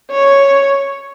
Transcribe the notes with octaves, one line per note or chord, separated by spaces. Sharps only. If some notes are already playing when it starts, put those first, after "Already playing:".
C#5